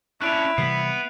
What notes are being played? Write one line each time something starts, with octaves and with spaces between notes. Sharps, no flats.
C#4 D4 E4 F#6 D7 F7
C3 E3 G3 B3 C7